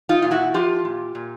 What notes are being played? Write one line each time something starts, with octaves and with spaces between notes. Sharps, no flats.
D#4 F4
A#2 F4
E4 F#4
F3 F4 G4
A#2
A#2